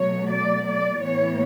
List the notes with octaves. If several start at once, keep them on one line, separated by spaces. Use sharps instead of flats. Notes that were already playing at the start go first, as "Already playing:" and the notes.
Already playing: B2 F#3 A3 C#5
D5
D5
A2 E3 B3 C#5